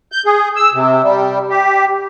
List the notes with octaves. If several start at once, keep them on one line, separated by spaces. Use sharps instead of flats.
G6
G#4
E6
C3
G3
G4